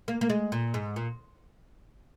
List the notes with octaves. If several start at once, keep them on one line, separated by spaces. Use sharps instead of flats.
A#3
A#3
G#3
A#2
G#2
A#2